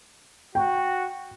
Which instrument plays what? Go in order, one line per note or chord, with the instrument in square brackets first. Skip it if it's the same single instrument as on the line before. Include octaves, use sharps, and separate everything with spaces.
[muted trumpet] F#4 [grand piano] G5